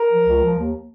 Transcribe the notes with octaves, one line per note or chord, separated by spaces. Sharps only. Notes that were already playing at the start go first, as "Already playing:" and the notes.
Already playing: A#4
F3
C#2
F3
D#2